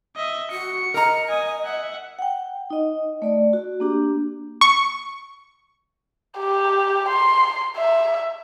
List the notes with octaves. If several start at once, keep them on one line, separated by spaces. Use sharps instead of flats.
D#5 E5
F#4 C#7
A#4 D#5 A#5
G#5 D#6
E5 F#5
F#5 G5
D#4 D#5
A3 D5
F#4
A#3 D4 G4
C#6
G4
C6
E5